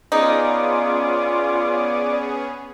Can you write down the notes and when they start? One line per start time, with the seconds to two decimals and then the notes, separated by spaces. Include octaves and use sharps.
0.12 B3 C#4 D#4 F4 G#4 D5